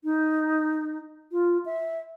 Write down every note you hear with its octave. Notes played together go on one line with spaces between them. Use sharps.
D#4
F4
E5